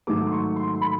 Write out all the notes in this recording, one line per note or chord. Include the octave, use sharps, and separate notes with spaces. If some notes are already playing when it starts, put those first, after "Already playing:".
G#2 D#3 F#3 A3 D6
C6
C#6
C6
C6
B5